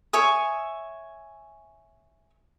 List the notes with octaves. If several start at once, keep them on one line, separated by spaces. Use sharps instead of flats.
C#5 E5 G#5 D#6